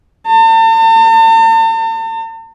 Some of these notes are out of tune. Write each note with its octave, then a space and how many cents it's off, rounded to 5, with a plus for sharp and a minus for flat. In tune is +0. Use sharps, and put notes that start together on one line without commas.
A5 +45